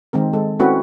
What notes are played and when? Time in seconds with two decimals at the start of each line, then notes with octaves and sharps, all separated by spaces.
0.13 D#3 G#3 C4 A#4
0.33 G#3 A4
0.59 A3 C4 C#4 E4 F#4 B4